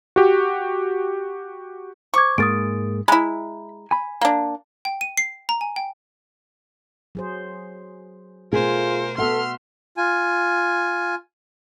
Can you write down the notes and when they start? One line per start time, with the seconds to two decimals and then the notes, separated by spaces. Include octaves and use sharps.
0.16 F#4 G4
2.14 C5 C#6 D6 G#6
2.38 G#2 G#3 A#3 D#6 A6 D7
3.08 G#3 E4 A#5 B5
3.91 G#5 B5
4.21 A#3 D4
4.85 G5
5.01 D#7
5.17 C7
5.49 A#5
5.61 G#5
5.76 G5
7.15 F#3 G#4 C5
8.53 B2 A3 F4 G#4 A#4 C5
9.18 B3 F#4 A4 E5 F#5 C6 F6
9.97 F4 G#5